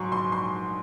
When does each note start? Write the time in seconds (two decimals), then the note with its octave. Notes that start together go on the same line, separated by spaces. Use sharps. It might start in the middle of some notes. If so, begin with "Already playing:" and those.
Already playing: G#2 F#3 C6 C#6
0.11 A#1 C6
0.32 C6